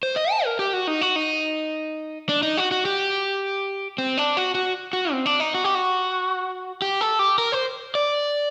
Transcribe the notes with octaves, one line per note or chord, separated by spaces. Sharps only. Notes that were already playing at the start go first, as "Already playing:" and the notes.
C5
D#5
A5
A#4
G4
F#4
D#4
F#4
D#4
D4
D#4
F#4
F#4
G4
C4
D4
F#4
F#4
F#4
C4
D4
D#4
F#4
G4
F#4
G4
A4
G4
A#4
C5
D5